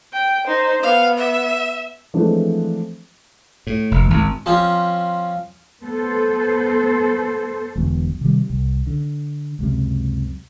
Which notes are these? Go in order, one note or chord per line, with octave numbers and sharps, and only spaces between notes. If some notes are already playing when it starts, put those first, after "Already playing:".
G5
D#4 C5
B3 F5
E5
E3 F3 G#3 A3 C4 D4
A2
F1
G#1
F3 C4 C#4
B3 A4 C5
E1 B1 B2 D3
C3 D#3 G3
C2
D3
C#2 F#2 C3